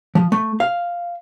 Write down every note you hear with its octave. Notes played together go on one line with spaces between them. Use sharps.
F3
A3
F5